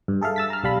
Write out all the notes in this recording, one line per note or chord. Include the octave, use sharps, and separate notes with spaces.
G2
G#4 A4 E5 F5
E6 A6 B6
A#5 F6
B1 G3 F5 A5 B5